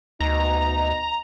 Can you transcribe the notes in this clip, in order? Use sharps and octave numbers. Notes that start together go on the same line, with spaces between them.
D2 B2 D#4 A#5